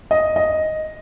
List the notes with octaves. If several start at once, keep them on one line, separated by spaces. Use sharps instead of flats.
D#5
D#5